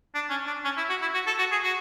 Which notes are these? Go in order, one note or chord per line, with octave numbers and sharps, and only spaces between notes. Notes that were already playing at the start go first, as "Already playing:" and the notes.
D4
C#4
D4
C#4
E4
F#4
E4
F#4
A4
F#4
G#4
F#4